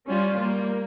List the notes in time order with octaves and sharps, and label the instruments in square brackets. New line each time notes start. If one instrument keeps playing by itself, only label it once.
[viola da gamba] G3 [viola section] C#4 F4
[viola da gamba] G3 [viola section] A#3